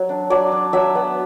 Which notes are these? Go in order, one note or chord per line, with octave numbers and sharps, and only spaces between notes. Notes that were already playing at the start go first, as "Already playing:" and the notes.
Already playing: F#3
D4
F#3 D5
D4
F#3 E5
B3